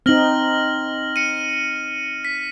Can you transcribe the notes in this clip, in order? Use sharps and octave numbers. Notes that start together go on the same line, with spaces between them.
C4 D#4 F6 A#6 F#7
C#7 D#7
B6